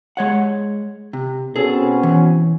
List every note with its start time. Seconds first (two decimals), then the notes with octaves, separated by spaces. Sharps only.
0.17 G#3 C#5 F#5
1.13 C3
1.56 B2 C4 C#4 G#4 A4
2.03 E3